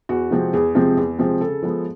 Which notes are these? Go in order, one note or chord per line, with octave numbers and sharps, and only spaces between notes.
E2 F#4
C3 F3 G#3 C4
E2 G#4
C3 F3 G#3 C4
E2
C3 F3 G#3 C4
C#3 A4
F3 G#3 B3